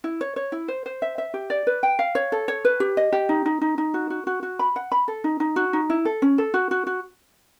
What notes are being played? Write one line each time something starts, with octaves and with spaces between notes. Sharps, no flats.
E4
C#5
C#5
E4
C5
C5
E5
E5
G4
D5
B4
G5
F5
C#5
A4
C#5
B4
G4
D#5
G4
D#4
D#4
D#4
D#4
F#4
F#4
F#4
F#4
B5
F#5
B5
A4
D#4
D#4
F#4
D#4
E4
A4
C#4
A4
F#4
F#4
F#4